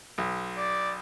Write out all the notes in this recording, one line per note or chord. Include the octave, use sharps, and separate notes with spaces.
B1
D5